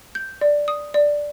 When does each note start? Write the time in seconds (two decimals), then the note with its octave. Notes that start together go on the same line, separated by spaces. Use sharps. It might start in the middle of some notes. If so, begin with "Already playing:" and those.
0.15 G6
0.41 D5
0.68 D#6
0.94 D5